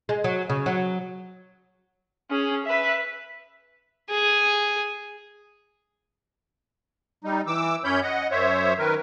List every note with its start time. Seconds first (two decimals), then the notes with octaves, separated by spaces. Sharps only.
0.09 G#3
0.24 F#3
0.49 C#3
0.66 F#3
2.30 C#4 G#4
2.66 B4 E5
4.10 G#4
7.24 G3 D#4
7.47 E3 D6 E6
7.84 F#2 C#4 C#5 B5 G6
8.03 D#5 F#5
8.31 F#2 C5 C#5 E5
8.79 D#3 A#4 B4